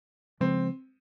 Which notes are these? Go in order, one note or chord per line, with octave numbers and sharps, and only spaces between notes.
C#3 F3 G#3 C4